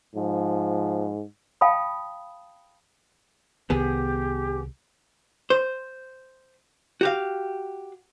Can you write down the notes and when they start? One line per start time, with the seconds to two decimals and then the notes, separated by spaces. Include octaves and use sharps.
0.15 G#2 F3
1.61 F5 G5 A5 B5 D#6
3.70 C2 D#3 B3 G4 G#4
5.50 C5
7.01 F#4 G4 F5